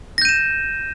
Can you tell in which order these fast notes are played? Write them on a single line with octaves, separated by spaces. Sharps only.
A#6 G6 D#7 E7